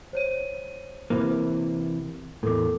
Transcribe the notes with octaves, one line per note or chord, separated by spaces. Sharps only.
C5 C#5 D#7
C3 E3 A#3
E2 A2 A4 A#4 D6